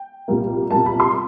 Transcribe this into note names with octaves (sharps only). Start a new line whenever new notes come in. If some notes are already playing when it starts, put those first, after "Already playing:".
Already playing: G5
C2 A#2 G3 A#3
C2 A#2 G3 A#3 A5
B5
C6